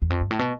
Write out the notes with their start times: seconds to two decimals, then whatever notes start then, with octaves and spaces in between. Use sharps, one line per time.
0.02 E2
0.10 F2
0.21 G2
0.31 A2
0.39 B2